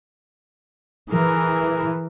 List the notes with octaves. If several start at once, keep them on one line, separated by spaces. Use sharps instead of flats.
E3 G#4 A#4